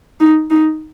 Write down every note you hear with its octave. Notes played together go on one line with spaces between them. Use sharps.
D#4
D#4